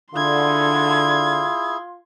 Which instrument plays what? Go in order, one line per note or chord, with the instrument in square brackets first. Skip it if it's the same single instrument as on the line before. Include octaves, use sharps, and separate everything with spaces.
[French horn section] D3 [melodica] E4 G#4 [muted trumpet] F4 [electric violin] C6 G#6